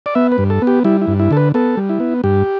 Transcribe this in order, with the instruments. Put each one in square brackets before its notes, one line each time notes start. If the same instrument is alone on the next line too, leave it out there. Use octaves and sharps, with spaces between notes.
[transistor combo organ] D5
B3 E5
B4
G2
A4
B3
G4
G3 E4
E4
G2
E4
D3 A4
B4
B3 A4
G3
E4
B3
G2 G4